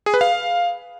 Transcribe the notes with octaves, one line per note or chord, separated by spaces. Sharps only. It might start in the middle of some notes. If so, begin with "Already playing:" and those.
G#4
B4
F5